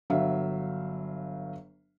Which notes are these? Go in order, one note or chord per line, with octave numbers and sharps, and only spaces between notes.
G1 F#3 E5 F5